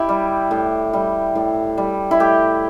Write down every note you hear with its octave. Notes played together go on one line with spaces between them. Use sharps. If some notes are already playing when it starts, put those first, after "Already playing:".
Already playing: E4 G4
G3
A2
G3
A2
G3
E4
A2 G4